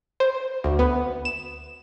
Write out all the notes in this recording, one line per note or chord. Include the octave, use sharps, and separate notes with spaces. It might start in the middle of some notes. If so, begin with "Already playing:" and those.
C5
D2
B3
E7